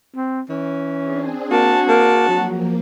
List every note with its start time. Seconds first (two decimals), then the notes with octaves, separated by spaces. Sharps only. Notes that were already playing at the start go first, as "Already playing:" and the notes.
0.16 C4
0.50 E3 C#4
1.02 C4 D4 G#4
1.51 A#3 F#4 A5
1.89 A#3 A5
2.29 F3 F#3 A#3